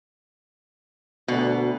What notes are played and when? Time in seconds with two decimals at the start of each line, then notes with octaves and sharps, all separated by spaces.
1.28 D2 B2